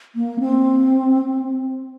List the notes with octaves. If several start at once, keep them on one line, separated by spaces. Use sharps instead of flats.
A#3
C4